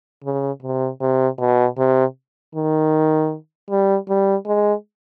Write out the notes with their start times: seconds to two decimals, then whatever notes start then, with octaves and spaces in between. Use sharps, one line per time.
0.24 C#3
0.62 C3
1.01 C3
1.39 B2
1.78 C3
2.55 D#3
3.70 G3
4.09 G3
4.46 G#3